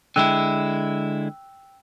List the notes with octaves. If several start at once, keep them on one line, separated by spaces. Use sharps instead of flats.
D3 G#3 E4 G5 E6 F#6